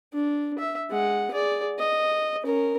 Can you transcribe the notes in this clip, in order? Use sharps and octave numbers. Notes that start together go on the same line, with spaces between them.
D4
E5
G#3 F#5
G#4 D5
D#5
C#4 A#4